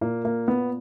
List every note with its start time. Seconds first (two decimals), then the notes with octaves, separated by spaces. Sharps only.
0.01 A#2 A#3
0.25 A#3
0.48 B3